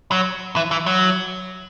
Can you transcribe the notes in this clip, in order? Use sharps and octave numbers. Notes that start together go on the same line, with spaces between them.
F#3
E3
E3
F#3